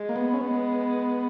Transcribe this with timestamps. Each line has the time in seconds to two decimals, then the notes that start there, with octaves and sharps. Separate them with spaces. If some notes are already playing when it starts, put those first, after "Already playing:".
Already playing: G#3
0.09 A#3
0.16 B3
0.33 C#4
0.41 G#3 B3